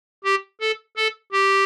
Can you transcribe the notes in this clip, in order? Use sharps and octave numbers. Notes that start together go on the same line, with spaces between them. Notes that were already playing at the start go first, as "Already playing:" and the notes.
G4
A4
A4
G4